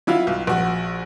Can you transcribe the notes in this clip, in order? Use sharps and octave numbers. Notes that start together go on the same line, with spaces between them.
F#3 E4 F4
B1
A#1 F#4